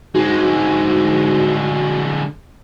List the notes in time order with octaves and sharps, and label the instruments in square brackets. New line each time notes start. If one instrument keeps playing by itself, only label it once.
[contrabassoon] G#2 [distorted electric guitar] D3 G#3 [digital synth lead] F#4